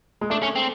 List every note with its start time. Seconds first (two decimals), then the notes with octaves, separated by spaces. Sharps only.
0.21 G#3
0.30 A3 D4
0.43 C#4
0.56 C4